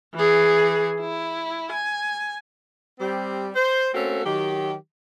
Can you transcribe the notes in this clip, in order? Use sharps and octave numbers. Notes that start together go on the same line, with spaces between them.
E3 G#4
E4
G#5
G3 C4 G4
C5
A3 A#3 C4 C#4 F#4 A4
D#3 F#3 G4